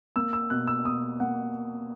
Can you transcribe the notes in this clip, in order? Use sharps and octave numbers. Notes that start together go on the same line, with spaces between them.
A#3 E6
E6
B2 F#6
E6
B2 D#6
A#3 F#5